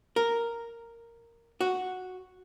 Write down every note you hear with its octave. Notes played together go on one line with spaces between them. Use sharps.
A#4
F#4